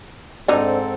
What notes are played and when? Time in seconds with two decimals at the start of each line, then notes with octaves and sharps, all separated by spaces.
0.48 G#2 D3 C4 D#4 A4